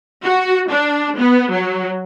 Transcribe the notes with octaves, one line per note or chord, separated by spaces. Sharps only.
F#4
D4
B3
F#3